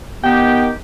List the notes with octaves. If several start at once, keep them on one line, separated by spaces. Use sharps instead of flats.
D#3 B3 G4 G5